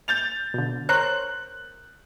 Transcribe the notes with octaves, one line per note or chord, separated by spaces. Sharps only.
G6 A6 F7
B2 D3
A#4 C5 C#5 F#6 F#7